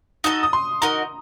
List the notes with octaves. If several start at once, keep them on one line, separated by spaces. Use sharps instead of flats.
D#4 F#4 A4 D#5 D#6
D#6
C6
D#4 F#4 A#4 D#5 A#5